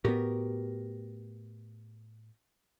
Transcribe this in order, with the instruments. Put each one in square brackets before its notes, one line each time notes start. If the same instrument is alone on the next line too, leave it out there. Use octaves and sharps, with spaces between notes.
[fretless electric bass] A2 B3 [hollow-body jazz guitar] F#4 G4 A#4